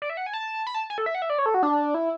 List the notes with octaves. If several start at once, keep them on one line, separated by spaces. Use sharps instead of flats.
D5
E5
F#5
G#5
A5
B5
A5
G#5
A4
E5
F#5
E5
D5
C#5
A4
F#4
D4
E4